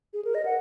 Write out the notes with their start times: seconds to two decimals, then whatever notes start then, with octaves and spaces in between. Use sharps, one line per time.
0.13 G#4
0.25 A#4
0.35 D#5
0.45 F#5